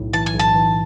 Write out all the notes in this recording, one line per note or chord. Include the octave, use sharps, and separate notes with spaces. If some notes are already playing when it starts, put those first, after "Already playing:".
Already playing: B1 A2
E3 A5
G#5
B1
A5
E3